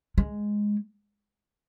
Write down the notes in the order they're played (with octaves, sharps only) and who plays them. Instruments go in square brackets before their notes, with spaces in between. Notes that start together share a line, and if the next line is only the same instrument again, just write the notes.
[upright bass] G#3